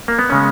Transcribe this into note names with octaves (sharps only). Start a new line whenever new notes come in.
A#3
B3
C#3 G#3 C#4